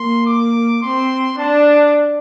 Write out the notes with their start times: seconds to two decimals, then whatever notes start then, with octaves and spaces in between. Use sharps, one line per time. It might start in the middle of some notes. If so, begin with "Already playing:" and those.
Already playing: A#3 C6
0.27 D6
0.82 C4 C6
1.39 D4 A5